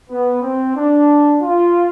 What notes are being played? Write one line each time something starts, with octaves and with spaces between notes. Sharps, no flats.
B3
C4
D4
F4